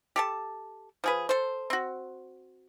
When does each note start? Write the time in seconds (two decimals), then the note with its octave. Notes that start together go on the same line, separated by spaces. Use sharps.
0.16 G4 A4 A5
1.04 F3 G#4 B4
1.29 A4 C5
1.70 C4 F#4